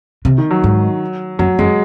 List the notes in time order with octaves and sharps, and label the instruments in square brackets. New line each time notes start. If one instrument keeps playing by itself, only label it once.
[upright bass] C3
[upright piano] D#3
F#3
[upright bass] G#2
[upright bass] F#2 [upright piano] F#3
[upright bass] F#2 [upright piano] G#3